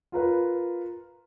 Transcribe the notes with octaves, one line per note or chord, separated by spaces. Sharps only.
F4 A#4 B4